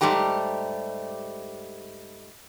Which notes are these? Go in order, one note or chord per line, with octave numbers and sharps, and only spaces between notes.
G#2 G3 A3 G4 A#5